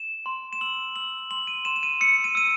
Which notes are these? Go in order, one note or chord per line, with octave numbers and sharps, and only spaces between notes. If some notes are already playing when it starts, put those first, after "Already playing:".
Already playing: E7
C6
E7
E6 F#7
E6 F#7
C6 F#7
D#7
C6 E7
E7
D#7
E6 C#7
D#7
E6 D#7